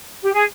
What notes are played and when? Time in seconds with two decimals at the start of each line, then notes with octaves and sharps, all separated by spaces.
0.23 G4
0.33 G#4